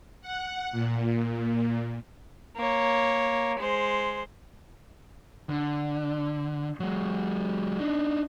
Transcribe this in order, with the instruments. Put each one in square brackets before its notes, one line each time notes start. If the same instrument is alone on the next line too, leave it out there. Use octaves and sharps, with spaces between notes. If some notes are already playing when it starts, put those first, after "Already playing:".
[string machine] F#5
A#2
[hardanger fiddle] A#3 C#5
G#3 C5
[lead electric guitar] D3
F#3 G#3
D4 D#4